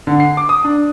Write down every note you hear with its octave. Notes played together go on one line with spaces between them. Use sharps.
D3
C7
D6
D#6
D4